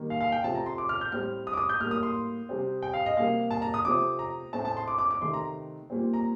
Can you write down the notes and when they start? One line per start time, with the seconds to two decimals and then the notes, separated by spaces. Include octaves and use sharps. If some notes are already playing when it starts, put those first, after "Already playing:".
Already playing: D#3 G3 A#3
0.10 F5
0.21 F5
0.32 G5
0.44 C3 F3 A3 C4 A5
0.55 A#5
0.66 C6
0.78 D6
0.89 F6
1.01 G6
1.12 A2 G3 C4 F6
1.47 D#6
1.53 D6
1.57 D#6
1.69 G6
1.80 A2 G3 A#3 F6
1.91 D#6
2.03 C6
2.49 C3 G3 C4
2.82 G5
2.94 F5
3.06 D#5
3.17 C3 G3 A#3 F5
3.51 A5
3.62 A#5
3.74 D#6
3.85 C3 F3 A3 C4 D6
4.19 A#5
4.53 A2 A3 C4 A5
4.65 A5
4.77 C6
4.88 D6
4.98 D6
5.11 D6
5.22 C3 D#3 A3 C6
5.34 A#5
5.90 A#2 G3 C4
6.14 A#5